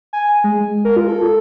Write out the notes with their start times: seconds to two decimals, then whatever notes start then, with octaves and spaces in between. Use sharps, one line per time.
0.13 G#5
0.44 G#3
0.85 A#4
0.96 F4
1.09 A4